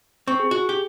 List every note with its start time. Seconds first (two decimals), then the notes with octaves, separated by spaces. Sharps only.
0.28 C4 C#6
0.40 G#4
0.51 F#4
0.69 G4